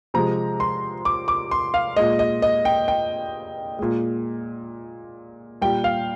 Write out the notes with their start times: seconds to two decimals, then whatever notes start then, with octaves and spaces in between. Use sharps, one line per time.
0.14 C3 F3 G#3 A#5
0.60 C6
1.05 D6
1.28 D6
1.51 C6
1.74 F5
1.96 A#2 G#3 D#5
2.19 D#5
2.42 D#5
2.65 G5
2.88 G5
3.79 A#2 G#3
5.61 A#2 G3 G5
5.84 F5